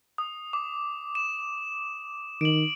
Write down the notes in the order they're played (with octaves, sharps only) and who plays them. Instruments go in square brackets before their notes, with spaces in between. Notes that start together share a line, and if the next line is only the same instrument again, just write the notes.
[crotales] D#6
D6
E7
[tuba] D#3 [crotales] D7 F#7